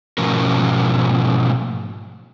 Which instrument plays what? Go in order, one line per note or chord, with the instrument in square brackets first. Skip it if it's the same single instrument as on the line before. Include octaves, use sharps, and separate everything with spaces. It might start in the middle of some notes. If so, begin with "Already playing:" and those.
[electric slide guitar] G#2 B2 F3 A3 C#4 A#4